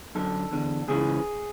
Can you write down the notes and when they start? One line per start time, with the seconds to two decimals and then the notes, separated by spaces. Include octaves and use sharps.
0.15 F#2 D3 A4
0.51 E2 D3
0.88 C#2 C#3 E3 G#4